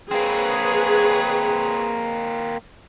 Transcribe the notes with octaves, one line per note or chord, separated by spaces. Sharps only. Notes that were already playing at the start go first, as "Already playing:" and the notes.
A#3 C4 G#4 B4 C#5